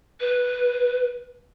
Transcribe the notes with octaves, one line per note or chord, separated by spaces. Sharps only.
B4